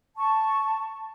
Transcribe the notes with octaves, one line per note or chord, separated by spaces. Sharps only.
A5 C#6